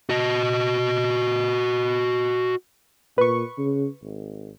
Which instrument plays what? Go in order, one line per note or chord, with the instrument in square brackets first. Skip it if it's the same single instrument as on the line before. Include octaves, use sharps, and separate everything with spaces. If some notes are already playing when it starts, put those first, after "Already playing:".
[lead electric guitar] F#4 D#5
[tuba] A#2 [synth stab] B4 C#6
[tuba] C#3
G#1